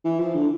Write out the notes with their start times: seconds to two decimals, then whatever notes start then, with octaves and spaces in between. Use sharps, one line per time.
0.05 E3
0.19 F3
0.35 D3